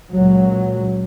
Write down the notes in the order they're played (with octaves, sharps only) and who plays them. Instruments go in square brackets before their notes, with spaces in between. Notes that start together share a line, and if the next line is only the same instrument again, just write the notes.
[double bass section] C#2 A#2 F#3